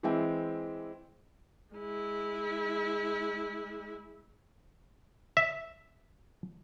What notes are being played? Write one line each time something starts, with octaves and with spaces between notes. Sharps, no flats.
E3 G#3 C4 E5 G5
G#3 E4
E5